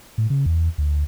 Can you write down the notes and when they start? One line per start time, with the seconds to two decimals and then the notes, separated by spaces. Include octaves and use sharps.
0.18 A2
0.30 C#3
0.46 E2
0.78 D2